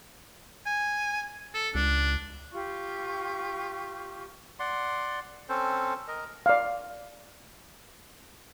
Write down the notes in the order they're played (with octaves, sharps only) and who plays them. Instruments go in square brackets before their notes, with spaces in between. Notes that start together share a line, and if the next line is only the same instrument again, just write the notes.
[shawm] G#5
A4
[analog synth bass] C#2 [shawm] D4
[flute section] F4 G4 C#6
[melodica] D5 F#5 C6
C4 C#4 A4 C5
A#4 D#5
[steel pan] D5 F5